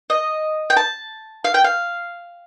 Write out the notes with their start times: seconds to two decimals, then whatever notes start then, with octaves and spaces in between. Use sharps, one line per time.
0.10 D#5
0.70 G5
0.77 A5
1.44 F5
1.54 G5
1.64 F5